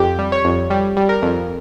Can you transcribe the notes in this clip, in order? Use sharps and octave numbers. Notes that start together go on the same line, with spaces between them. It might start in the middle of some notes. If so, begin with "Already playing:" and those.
Already playing: F2 G4
G3
C#5
F2
G3
G3
A#4
F2